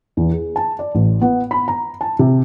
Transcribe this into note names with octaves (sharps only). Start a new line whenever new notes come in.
E2
G#4
A5
D5
A1
B3
B5
A#5
A5
C3